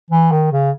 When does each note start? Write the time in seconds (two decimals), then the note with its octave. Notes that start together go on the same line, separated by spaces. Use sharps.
0.10 E3
0.31 D#3
0.52 C#3